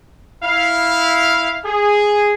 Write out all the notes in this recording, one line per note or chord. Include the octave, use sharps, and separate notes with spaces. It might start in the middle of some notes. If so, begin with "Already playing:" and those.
E4 F5
G#4